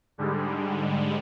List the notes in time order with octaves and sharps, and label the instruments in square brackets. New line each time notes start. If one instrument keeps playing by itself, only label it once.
[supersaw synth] G#2 D3 G3 G#3